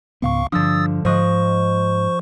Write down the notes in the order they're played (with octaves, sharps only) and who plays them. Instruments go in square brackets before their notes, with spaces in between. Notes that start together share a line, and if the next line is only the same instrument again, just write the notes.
[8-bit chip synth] C#2 F5 C#6 [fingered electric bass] G#2 C#3 B3
[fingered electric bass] G2 D4 [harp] D3 F3 [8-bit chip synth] D#6 E6 A6
[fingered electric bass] G#2 [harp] F3 D#5 F#6 [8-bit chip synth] C5 C#6